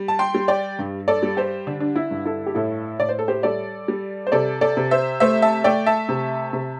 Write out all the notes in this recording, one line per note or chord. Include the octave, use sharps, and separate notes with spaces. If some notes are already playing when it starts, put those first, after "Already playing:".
Already playing: G3
A5
G5 C6
G3
D5 G5
G2
A4 D5
G3
G4 C5
D3 D4
D4
E4
G2
E4 A4
G4
A2 E4 A4
A2 D5
C5
A4
G4 C5
G3 A4 D5
G3
C5
C3 A4 D5
A4 D5
C3
C5 E5
A3 C5 E5
E5 A5
A3 D5 G5
E5 A5
C3
C3